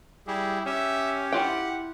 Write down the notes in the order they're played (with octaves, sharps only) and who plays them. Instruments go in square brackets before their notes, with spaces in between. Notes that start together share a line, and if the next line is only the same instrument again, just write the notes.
[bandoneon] G3 G4 G#4 [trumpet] E4
[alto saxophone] C#4 [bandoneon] G4 [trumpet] E5
[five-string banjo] E4 F4 G5 [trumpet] F#5